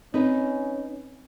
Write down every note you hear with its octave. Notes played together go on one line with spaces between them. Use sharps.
C4 C#4 D#4 B4